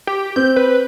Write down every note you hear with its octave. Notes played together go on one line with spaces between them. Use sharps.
G4
C4 G6
B4